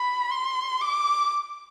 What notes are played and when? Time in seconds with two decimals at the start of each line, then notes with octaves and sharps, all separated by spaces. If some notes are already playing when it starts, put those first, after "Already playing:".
Already playing: B5
0.31 C6
0.81 D6